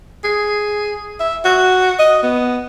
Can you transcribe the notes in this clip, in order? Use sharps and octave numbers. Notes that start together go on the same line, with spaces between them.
G#4
E5
F#4
D#5
B3